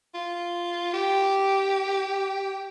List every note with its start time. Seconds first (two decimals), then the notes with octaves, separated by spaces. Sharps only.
0.15 F4
0.94 G4